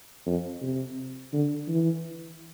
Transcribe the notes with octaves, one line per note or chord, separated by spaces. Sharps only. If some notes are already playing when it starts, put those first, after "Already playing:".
F2
C3
D3
E3